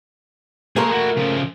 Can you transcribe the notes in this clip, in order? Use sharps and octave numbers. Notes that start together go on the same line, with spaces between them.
A3 A#3 G#4 A#4 C6
E4 F#4
C#3 F3